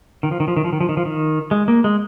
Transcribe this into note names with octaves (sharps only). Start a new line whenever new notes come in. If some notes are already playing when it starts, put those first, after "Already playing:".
D#3
F3
D#3
F3
D#3
F3
D#3
F3
D#3
F3
D#3
G#3
A#3
G#3